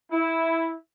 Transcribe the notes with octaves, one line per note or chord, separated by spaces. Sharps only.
E4